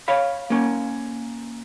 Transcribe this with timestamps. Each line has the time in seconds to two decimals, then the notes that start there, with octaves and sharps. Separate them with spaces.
0.08 C#5 F5 B5
0.50 A#3 C#4